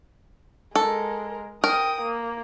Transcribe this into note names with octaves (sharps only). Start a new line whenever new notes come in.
G#3 A4 A#4
A#4 G5 D#6
A#3